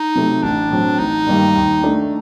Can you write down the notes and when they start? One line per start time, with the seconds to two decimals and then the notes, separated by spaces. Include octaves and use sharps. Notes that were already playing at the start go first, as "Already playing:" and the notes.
Already playing: D#4
0.15 C3 F#3 A3
0.43 A1 D4
0.70 A2 F#3 C4
0.99 A1 D#4
1.26 G2 D#3 G3 A#3
1.55 D#2
1.83 D#3 A3 D4